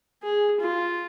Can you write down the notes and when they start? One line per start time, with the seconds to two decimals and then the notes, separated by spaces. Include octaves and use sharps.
0.23 G#4
0.60 F4